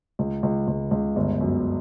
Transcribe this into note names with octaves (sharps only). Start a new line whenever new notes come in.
C#2
C#2
C#2
C#2
G1
F#2